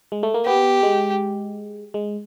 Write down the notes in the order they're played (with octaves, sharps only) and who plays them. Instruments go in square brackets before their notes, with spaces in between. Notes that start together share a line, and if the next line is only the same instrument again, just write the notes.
[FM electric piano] G#3
A3
A#3
[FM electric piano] B3 [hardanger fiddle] G4
[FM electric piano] G#3
G#3